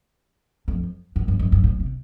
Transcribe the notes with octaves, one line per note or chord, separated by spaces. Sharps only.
F2
F#2
F#2
F#2
F#2
A2
C3